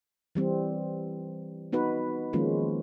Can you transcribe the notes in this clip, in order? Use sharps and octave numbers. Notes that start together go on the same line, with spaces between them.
E3 G3 C4
B3 D#4 F#4 B4
D#3 F3 G#3 A#3 C#4 F4